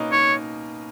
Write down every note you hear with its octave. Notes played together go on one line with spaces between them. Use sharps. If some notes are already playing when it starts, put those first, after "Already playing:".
Already playing: B2 A#3 B3 C#4 D#4
D#4 C#5